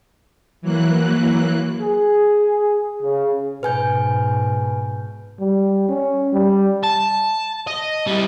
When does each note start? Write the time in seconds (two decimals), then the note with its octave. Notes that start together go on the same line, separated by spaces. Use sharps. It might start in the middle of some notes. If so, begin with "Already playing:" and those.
0.62 E3 F#3 A#3 F#6
1.80 G#4
3.03 C#3
3.63 G#2 B2 B4 G#5 G6
5.39 G3
5.89 C#4
6.33 G3
6.83 A5
7.67 D#5
8.07 G3 E4